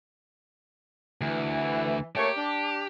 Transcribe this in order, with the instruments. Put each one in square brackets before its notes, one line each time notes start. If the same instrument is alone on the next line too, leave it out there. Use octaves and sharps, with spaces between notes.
[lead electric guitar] D2 [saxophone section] E3
[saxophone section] A3 A#3 C#5 [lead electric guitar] G4
[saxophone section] D4